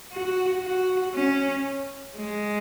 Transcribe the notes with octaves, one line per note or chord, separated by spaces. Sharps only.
F#4
F#4
C#4
G#3